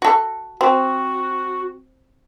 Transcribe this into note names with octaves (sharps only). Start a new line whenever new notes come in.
F#4 A4
C4 F#4